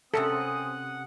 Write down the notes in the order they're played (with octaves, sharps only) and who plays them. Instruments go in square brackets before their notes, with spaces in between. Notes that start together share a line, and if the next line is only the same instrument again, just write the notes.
[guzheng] C3 C#4 A#4 [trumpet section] C4 G#5 D#6 [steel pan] A4 [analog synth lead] F#5